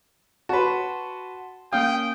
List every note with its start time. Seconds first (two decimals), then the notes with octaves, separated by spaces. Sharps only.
0.49 F#4 B4 A5 C6
1.73 A#3 C#4 F5 G5 D#6